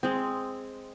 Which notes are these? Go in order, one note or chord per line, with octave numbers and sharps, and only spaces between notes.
G#3 C4